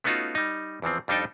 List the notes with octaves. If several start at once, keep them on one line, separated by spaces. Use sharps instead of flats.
A3 B3 C#4 D#4 F4 F#4
G3 D#4
E2 E3 F3 C4
F2 G3 D4 D#4 A4 G5